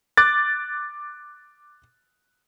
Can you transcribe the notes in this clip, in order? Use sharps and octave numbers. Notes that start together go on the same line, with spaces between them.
D6 F#6 A6